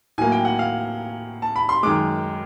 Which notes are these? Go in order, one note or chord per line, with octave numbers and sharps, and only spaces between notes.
A2 F#3 A#3 G#5
G5
F#5
F5
A5
B5
C6
F#2 D#3 G#3 D6